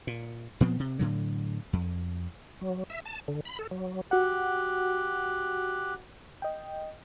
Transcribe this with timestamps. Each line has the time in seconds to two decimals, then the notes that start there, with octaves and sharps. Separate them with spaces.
0.07 A#2
0.61 A#2 F3 B3 C4
0.80 C3
0.99 A2 D3 F#3
1.73 F2
2.61 F#3
2.90 E5
3.05 A5
3.28 D3
3.45 B5
3.59 A4
3.71 F#3
4.11 F#4 G4 F#5 F#6
6.42 D#5 G5